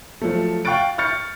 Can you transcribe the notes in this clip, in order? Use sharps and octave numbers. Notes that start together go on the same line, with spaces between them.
F3 F#3 A3
F5 G5 C#6 F#6 A6 D7
C#6 F6 G6 A6 C#7